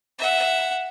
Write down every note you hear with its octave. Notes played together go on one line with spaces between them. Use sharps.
E5 F#5